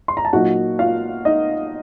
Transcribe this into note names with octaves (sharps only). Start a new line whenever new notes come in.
C6
A#5
A5
A#2 F#3 A#3 D#4 F#4 F#5
F4 F5
D#4 D#5